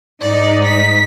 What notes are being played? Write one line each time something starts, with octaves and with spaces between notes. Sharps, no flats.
G#2 D#4 D5
B6